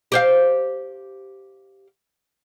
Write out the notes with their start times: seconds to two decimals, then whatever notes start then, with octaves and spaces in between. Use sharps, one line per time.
0.12 G4 C5 F5